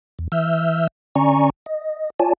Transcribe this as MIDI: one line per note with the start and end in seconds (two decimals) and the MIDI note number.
0.19 0.28 40
0.32 0.87 52
0.32 0.87 76
0.32 0.87 88
0.32 0.87 89
0.32 0.87 91
1.15 1.50 50
1.15 1.50 61
1.15 1.50 74
1.15 1.50 80
1.15 1.50 82
1.15 1.50 85
1.66 2.10 75
2.20 2.33 65
2.20 2.33 73
2.20 2.33 74
2.20 2.33 80
2.20 2.33 81